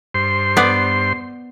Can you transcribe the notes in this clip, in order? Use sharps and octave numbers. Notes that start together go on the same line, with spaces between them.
G2 C5 C6
B3 D5